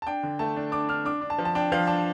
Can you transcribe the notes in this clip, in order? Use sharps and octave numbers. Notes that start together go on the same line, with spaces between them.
A5
D4 G5
D3
A3 A5
D4
D4 D6
D4 F6
D4 D6
D4
A5
F3
A5
D4 G5
F3 F5
D4 A5